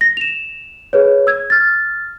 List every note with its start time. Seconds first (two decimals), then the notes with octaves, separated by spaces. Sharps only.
0.01 A#6
0.17 E7 F7
0.93 G#4 B4 C#5
1.27 E6 G#6
1.50 F6 A6